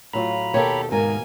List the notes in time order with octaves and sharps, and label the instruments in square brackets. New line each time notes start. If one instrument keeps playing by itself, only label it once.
[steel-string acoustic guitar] A2 F#3 F4 [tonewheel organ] A#5 B5
[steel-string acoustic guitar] D#2 B2 [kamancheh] G4 A4 [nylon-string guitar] A#4 C#5
[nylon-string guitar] G#2 A#4 [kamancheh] A#3 G#5